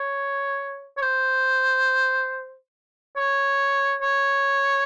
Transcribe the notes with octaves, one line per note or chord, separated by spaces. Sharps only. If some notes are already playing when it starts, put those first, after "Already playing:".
Already playing: C#5
C#5
C5
C#5
C#5